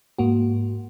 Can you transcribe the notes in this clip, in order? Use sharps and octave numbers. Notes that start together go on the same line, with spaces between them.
G#2 A#3 F#4